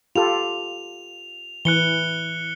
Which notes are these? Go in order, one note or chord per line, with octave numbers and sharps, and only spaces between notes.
F4 G4 A4 F7
E3 F#6 C#7 G7